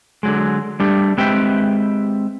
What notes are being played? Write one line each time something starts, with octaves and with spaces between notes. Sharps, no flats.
D3 F#3 G#3
G3 A3 D4 G4
G#3 C4 G4 B4 E5 G5